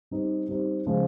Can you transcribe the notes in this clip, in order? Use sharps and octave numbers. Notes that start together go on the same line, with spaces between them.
G3 C4 D#4
G3 C4 D#4
C#3 F3 G#3